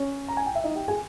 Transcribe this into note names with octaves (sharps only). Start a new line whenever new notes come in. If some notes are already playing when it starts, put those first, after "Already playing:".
Already playing: C#4 C#5
A#5
G#5
G5
E5
D#4 D#5
G4 G5
G#4 G#5